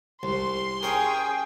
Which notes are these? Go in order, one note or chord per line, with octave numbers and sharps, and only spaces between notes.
C2 C6
C#4 G#4 A#4 G5